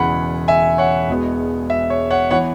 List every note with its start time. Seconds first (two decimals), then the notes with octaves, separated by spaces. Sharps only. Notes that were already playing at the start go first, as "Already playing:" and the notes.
Already playing: E1 E2 C#3 E3 F#5 B5
0.48 E5 G#5
0.78 C#5 F#5
1.09 E1 E2 B2 G#3 B3
1.70 E5
1.90 C#5
2.11 C#5 F#5
2.30 E3 B3 C#5 F#5